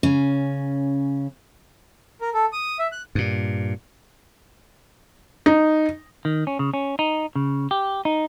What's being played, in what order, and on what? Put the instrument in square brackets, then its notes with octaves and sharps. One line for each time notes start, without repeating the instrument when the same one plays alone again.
[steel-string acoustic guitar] C#3 C#4
[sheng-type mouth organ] A#4
A4
D#6
E5
F#6
[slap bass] G2 A#2
[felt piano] D#4
[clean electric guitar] D#3
C#4
C#3
C#4
D#4
C#3
G4
D#4